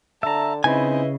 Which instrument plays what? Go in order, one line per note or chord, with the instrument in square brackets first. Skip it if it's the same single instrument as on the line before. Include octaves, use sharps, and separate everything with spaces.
[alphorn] D3 [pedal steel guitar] E5 A#5 [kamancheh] A5
[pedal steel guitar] C#3 [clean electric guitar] C4 D#4 G#5 [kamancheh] E4 D#5 [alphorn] B4